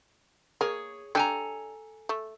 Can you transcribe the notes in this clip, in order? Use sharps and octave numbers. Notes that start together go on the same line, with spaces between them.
A#3 G#4 C#5
D4 G4 A4 G#5 A#5
A3